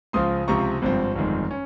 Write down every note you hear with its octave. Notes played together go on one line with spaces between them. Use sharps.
C#2 C#3 F3 C6 D#6
C#2 C3 F3 C4 A#5 C#6
G#1 G2 F3 C4
G1 F2 D#3 G#3
C#4